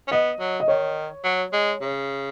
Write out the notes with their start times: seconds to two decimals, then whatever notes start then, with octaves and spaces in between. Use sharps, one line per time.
0.08 C#4
0.11 B3 D#5
0.39 F#3
0.60 D#5
0.68 D#3 C#5
1.24 F#3
1.53 G#3
1.81 C#3